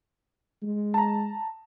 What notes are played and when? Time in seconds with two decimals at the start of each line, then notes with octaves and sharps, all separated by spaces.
0.62 G#3
0.94 A5 A#5